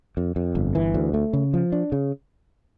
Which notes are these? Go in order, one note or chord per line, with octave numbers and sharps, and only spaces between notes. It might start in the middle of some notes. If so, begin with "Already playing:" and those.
F2
F2
G1
E3
D2
A3
C#3
F3
D4
C#3